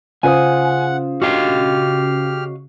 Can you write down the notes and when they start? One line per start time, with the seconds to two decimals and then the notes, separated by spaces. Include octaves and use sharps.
0.23 C#3 F4 C5 F#5 G#5 D#6
1.22 F#4 G4 D#5 F5 F6